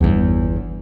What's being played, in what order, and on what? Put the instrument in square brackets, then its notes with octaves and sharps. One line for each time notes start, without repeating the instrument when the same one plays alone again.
[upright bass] G1 E2